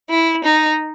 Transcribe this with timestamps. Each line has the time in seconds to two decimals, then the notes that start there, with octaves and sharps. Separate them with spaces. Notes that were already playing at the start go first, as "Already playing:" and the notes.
0.10 E4
0.44 D#4